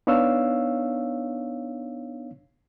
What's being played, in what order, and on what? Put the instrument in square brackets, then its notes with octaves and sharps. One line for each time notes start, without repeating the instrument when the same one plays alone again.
[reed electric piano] B3 D4 D#4 C#5 F5 E6